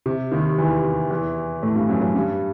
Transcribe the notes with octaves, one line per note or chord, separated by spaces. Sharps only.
C3
D#2 D#3
E2 E3
E2 E3
A2 A3
G2 G3
F#2 F#3
F#2 F#3
G2 G3